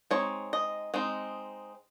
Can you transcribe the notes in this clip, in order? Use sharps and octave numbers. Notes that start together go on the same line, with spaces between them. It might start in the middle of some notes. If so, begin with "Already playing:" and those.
G#3 C4 D#4 C#5
D#5
G#3 C4 D#4